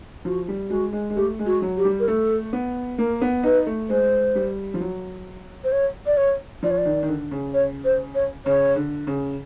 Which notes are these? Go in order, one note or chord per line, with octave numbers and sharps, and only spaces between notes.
F3 F#4
G3
G#3 F#4
G#3
G#3
A3 G4
G#3
F#4
F#3
G4
G3
A#4
A3 A4
B3
A#3 A#4
B3
D#4 B4
A3
G#3 C5
G3
F3
F#3
C5
C#5
D5
C#5
F3 D5
C#5
D5
D#3
D#3
D3
C#3
C#5
C5
C#5
C#3 C#5
D3
C#3